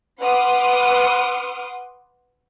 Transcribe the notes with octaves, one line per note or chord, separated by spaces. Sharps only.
B4 F#5 C6 D6 D#6 F6